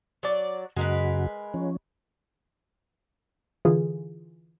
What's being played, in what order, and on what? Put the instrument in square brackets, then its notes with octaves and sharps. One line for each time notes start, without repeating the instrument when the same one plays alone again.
[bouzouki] F#3 D5
[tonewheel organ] F#2 C#3 F#4 [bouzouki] G#3 A#4 B4
[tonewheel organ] F3 C#4
[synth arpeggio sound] D3 E3 F4 G#4